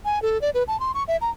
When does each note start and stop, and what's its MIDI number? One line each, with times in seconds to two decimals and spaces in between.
0.05 0.22 80
0.22 0.40 69
0.41 0.50 74
0.54 0.63 71
0.68 0.79 81
0.80 0.92 84
0.94 1.04 85
1.08 1.17 76
1.21 1.30 82